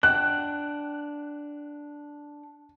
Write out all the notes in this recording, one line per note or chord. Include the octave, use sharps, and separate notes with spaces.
D4 F#5 G5 F#6